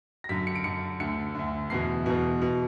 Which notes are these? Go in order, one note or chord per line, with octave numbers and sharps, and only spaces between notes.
A#6
F#2 D3 B6
C#7
D7
F#2 D3 C#7
D2 D3 C#7
D2 D3
E2 B2 C7
E2 B2
B2